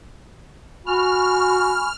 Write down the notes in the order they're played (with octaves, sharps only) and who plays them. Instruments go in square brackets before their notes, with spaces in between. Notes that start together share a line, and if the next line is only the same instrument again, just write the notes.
[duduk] F#4 [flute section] G#5 B5 C#6 [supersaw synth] F6